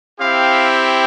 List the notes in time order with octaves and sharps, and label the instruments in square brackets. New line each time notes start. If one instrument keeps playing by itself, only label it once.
[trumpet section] C4 E4 G4 F5